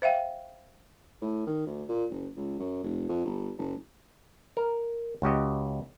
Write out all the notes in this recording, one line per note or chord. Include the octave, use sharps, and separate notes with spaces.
C5 E5 F5 G5
A2
D#3
D2
A#2
F#1
C#2
F#2
F1
F2
G1
F#1
A#4
C#2 F#4 G4 D#5